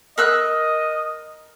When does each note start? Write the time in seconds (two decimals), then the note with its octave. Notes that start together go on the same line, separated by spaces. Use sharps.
0.18 A#4 D#5 E6 F#6